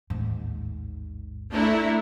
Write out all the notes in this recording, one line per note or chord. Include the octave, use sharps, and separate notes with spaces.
A1 D#2 G#2
A3 D4 E4 A#5